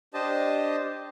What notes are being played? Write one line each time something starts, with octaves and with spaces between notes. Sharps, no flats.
D4 G4 C5 D#5 A5